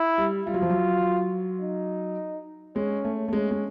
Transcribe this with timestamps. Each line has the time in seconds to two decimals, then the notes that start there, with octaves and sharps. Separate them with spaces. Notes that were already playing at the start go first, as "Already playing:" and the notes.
Already playing: E4
0.18 G3
0.46 G3 F4
0.54 F#3
0.62 F3
0.70 F#3
1.61 D#4
2.76 G#3 C#4
3.05 A3
3.28 A3
3.33 G#3 C#4
3.51 G#3